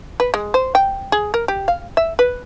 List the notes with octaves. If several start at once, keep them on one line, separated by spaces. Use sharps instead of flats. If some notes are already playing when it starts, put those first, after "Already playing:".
B4
G#3
C5
G5
G#4
A#4
G4
F5
E5
B4